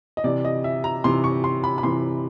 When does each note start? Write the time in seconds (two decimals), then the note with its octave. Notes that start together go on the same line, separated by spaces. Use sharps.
0.17 D#5
0.24 C3 E3 D5
0.45 D#5
0.64 E5
0.84 A#5
1.04 C3 E3 C6
1.24 C#6
1.44 C6
1.64 B5
1.78 B5
1.83 C3 E3 C6